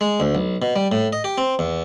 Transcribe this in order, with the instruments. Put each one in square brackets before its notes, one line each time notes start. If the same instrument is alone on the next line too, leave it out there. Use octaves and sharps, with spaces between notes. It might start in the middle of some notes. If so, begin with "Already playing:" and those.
[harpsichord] G#3
D2
B1
B2
G3
A2
D#5
G4
C4
E2